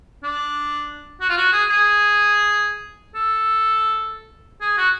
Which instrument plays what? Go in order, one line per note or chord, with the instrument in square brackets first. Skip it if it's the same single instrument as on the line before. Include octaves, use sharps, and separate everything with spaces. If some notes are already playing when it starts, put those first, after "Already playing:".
[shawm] D4
F#4
F4
F#4
G#4
G#4
A4
G#4
F#4